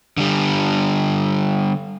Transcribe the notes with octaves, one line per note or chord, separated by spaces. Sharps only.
D3 G3